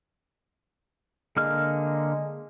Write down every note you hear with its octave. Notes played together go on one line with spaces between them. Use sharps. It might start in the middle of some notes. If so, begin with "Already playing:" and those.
D3 G#3 A#3 F6